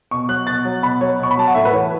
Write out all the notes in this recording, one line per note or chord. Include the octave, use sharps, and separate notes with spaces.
B2 C#6
F#3 F#6
B2 A6
F#3
B2 B5
F#3 C#5
B2 C#6
B5
F#3 A5
F#5
A2 E5
B4
E3 C#5